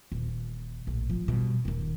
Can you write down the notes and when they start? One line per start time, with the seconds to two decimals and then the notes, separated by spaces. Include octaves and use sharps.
0.12 D#1
0.87 A#1 A2
1.10 F3
1.28 B2 G3
1.65 D#1 D#3